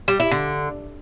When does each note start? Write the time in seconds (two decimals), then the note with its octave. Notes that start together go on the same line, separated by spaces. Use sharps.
0.08 G3
0.20 E4
0.31 D3